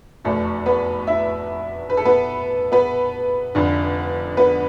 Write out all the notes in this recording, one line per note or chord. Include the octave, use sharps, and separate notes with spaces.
F1 E2 B2 A3 A4
B3 B4
E4 E5
B4
A4
B3 B4
B3 B4
F1 F2 D3
B3 B4